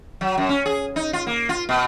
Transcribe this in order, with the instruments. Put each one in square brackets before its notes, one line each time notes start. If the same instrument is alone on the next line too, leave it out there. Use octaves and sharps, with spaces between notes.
[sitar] F#3
F#2
C#4
G#4
D#4
F4
A#3
F4
B2